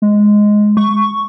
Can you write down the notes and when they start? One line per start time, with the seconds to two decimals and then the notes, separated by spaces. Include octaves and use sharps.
0.02 G#3
0.77 C#6